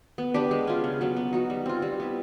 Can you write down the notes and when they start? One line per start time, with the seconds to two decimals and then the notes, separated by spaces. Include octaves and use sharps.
0.18 B3
0.34 D4 G4 B4
0.51 G#3
0.67 C#4 F4
0.84 C#3
1.01 F#3 B3
1.17 B3
1.33 D#4 F#4
1.50 G3
1.66 C4 F4
1.82 G3
2.00 B3 E4